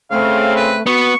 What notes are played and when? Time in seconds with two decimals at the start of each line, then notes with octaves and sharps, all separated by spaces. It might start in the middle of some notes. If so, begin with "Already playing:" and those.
0.11 C#3 A3 C4 F5
0.56 B4
0.86 B3 F#4 C#6